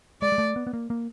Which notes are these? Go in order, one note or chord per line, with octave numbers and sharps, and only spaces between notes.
G#3 D5
G#3
A3
B3
B3
A#3
A#3